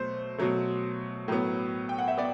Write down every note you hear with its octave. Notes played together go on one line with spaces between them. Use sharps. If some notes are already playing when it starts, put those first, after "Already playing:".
Already playing: B2 F#3 A3 C5
B2 F#3 A3
A2 F#3 B3
G5
F#5
E5
B3 D5